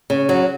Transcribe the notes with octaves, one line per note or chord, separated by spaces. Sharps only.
C#3
F#3